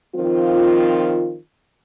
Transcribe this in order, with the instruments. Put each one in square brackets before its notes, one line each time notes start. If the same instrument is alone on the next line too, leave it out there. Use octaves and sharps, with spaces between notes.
[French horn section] D#3 F3 C4 F4